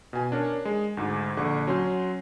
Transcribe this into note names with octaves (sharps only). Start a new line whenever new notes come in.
B2 G#5
C#4 D4 A#4 C#5
G#3
D2 G#2
A#1 D3 C#6
F#3 C#4 C6 G6